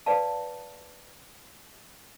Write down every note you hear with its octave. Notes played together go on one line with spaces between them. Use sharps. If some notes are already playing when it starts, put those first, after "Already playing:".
B4 D5 F5 A5